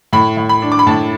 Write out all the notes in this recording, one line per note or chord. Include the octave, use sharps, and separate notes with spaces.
A2 B5
A2
B5
D4
D6
B5
A2 A5